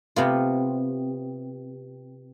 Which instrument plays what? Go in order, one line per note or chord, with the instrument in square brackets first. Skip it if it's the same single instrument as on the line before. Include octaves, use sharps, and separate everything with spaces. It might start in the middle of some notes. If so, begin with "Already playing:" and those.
[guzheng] C3 B3 F4